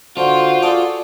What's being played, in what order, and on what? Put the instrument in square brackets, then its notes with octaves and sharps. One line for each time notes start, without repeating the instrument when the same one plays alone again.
[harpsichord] D3 [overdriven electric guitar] F4 [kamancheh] F#4 [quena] C5
[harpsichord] G#4 A4 D5